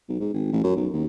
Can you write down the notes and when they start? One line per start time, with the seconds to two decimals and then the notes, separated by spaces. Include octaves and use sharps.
0.09 B1
0.20 G#2
0.34 G#1
0.52 A1
0.64 F#2
0.76 B1
0.93 D#2